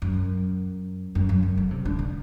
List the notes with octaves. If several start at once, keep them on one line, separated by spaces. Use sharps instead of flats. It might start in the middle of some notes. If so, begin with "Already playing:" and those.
F#2
F#2
F#2
D3
D3
C3
D3
D3